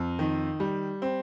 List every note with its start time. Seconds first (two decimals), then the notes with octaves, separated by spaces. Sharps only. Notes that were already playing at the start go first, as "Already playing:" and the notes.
Already playing: F2
0.19 D#3
0.60 G3
1.02 C4